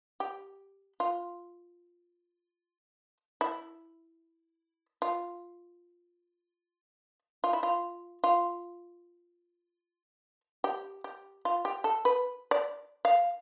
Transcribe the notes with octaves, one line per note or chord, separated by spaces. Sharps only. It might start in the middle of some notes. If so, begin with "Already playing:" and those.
G4
F4
E4
F4
F4
E4
F4
F4
G4
G4
F4
G4
A4
B4
D5
F5